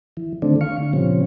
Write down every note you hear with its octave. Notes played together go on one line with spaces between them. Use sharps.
E3
D3 D#3 A3 C4 D4
F5 C#6
D3
A#2 C#3 F3 G3 C4 C#4